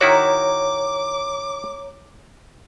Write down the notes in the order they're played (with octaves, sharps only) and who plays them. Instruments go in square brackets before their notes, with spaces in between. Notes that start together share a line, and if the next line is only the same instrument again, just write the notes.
[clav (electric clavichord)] D#3 E4 F#4 [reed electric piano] C#5 A#5 [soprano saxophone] D6